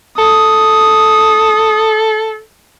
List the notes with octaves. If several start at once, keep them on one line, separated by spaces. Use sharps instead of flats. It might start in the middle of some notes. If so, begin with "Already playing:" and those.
A4 D#6